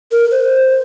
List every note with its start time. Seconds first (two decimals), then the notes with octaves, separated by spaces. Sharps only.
0.12 A#4
0.31 C5